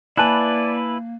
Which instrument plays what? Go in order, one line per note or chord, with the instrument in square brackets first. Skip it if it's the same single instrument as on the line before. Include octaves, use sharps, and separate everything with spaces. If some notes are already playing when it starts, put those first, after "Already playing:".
[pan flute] A#3 [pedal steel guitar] E4 B4 [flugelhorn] D5 [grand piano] G#5 A5 F#6